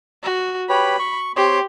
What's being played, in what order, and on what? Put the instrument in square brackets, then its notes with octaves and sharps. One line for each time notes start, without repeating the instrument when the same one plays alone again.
[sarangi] F#4
[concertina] G4 B4 C#5 [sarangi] B5
[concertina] C#6
[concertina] C4 C#5 C6 [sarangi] G4